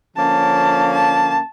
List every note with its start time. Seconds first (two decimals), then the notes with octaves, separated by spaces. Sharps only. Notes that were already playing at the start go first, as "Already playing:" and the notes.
0.16 D3 F3 A#3 C#4 A5
0.92 A5